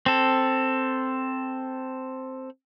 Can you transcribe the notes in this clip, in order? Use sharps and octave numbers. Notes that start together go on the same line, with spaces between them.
C4 A4